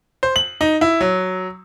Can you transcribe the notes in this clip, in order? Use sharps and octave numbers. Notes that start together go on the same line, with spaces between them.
C5
F#7
D#4
E4
F#3